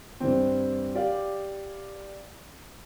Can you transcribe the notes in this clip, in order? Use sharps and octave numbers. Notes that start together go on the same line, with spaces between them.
G2 E3 C4
G4 D5 F5